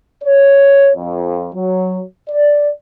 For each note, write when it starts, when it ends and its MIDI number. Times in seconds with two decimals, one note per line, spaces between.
0.23 0.90 73
0.96 1.49 41
1.55 2.01 54
2.29 2.68 74